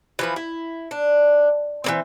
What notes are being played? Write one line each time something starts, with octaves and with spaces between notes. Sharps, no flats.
E3 F3 B4
E4
D4
E3 A#3 C4